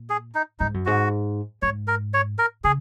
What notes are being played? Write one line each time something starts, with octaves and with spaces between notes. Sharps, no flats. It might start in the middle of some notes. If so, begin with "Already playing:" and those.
Already playing: A#2
G#4
D#4
G#2 D#4
F#2
G#2 F#4
G#2 C#5
A#4
C#5
A#4
C#3 G#4